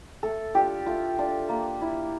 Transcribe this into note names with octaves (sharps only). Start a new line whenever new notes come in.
A3 A4
D4 F4 G4
A3 F4
D4 F4
A#3
E4